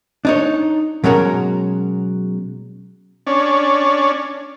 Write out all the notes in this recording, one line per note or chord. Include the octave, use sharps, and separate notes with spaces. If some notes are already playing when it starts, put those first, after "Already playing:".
D4 D#4 C#5
B2 F#3 G#3 C#4 F#4 A#4
C#4 D4